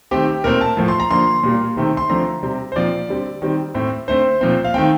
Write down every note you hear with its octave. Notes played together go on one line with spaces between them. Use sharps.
D#3 A3 C4 G4
A#2 A3 C4 A#4
A5
A2 F3 A3
C6
A#5
D3 F3 A#3 C6
A#2 G3 A#3
C3 D#3 A3 C4
C6
D3 F3 A3 C4 A#5
C3 G3 C4
C5
A#2 F3 C4 D5
D3 G3 C4
D#3 G3 C4
A2 A3 C4
D3 A3 C4 C5
A#2 F3 A3 C4
F5
D#3 A3 C4 G5